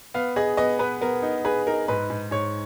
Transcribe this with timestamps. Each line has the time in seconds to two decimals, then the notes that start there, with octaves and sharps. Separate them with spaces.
0.14 B3 F5
0.36 G#4 D#5
0.57 B3 D#5
0.79 B3 B4
1.01 B3 A#4
1.22 D#4
1.45 G#4 B4
1.67 D#4 A#4
1.88 G#2 B4
2.10 G#2
2.31 G#2 C#5